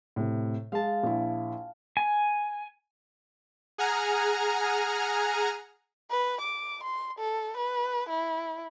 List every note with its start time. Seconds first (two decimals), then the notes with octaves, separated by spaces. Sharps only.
0.16 A2 C3
0.72 G#3 F5 A5
1.03 A#1 E4
1.97 G#5
3.78 G#4 F#5 G#5 A#5 F6
6.11 B4
6.41 D6
6.84 C6
7.19 A4
7.57 B4
8.09 E4